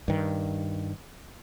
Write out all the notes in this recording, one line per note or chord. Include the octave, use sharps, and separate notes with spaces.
G2 D#3